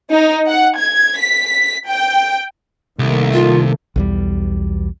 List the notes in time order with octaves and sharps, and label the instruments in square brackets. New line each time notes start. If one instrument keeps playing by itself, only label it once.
[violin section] D#4
F#5
G#6
B6
G5
[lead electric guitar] C2 [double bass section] D#3 A3 A#3
[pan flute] F4
[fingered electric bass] B1 E2 G3